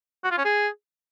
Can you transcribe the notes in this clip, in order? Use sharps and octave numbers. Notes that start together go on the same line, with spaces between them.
F#4
F4
C#4
G#4